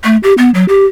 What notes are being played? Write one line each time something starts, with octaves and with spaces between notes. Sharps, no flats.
A3
G4
B3
F#3
G4